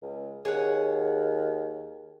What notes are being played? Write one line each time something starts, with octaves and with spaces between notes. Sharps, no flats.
C#2
D#2 G#4 C#5 F#5